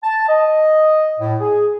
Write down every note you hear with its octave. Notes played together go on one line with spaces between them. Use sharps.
A5
D#5
A2
G#4